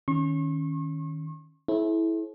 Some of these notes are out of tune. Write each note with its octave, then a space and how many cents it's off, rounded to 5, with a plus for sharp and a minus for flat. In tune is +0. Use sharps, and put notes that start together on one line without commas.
D#3 +0 C#4 +0 C#6 -40
E4 -10 A4 -45 C5 +40